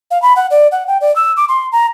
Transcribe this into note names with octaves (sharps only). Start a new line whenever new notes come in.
F5
B5
F#5
D5
F#5
G5
D5
E6
D6
C6
A#5